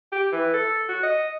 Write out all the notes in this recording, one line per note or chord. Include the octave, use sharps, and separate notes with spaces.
G4
E3
A4
F#4
D#5